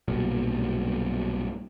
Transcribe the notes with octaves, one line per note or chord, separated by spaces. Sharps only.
B1 G2 A#2 F#3